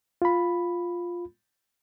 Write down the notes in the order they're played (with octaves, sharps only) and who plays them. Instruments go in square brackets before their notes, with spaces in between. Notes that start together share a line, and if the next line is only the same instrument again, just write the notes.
[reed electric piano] F4 B5